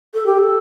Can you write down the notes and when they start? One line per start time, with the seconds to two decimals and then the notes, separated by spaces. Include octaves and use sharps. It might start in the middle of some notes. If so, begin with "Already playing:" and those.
0.14 A4
0.26 G4
0.38 A4